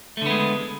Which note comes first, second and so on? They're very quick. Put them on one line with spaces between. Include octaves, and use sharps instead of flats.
A3 D3 B3 G#3